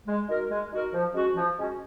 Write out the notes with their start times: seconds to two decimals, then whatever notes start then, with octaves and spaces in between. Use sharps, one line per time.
0.07 G#3
0.28 D#4 F#4 A#4
0.50 G#3
0.71 D#4 F#4 A#4
0.93 F3
1.14 G#3 C#4 F#4
1.36 F3
1.57 G#3 C#4 F#4